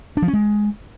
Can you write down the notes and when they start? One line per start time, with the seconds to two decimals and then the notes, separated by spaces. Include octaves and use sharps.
0.17 D4
0.22 F3
0.28 C#4
0.33 G#3